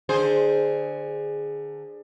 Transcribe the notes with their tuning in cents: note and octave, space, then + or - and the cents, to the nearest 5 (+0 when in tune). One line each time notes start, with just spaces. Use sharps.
D3 +20 G#4 +0 C5 +0